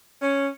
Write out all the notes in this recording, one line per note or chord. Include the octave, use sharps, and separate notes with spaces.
C#4